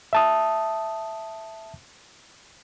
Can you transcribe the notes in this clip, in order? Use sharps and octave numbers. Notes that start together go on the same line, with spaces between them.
E5 A5 D#6